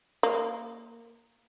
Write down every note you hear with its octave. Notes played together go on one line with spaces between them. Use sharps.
A#3